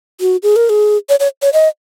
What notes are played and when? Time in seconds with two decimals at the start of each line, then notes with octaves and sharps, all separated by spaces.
0.21 F#4
0.43 G#4
0.56 A#4
0.70 G#4
1.09 C#5
1.20 C#5
1.42 C#5
1.53 D#5